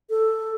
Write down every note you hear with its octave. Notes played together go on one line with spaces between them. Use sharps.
A4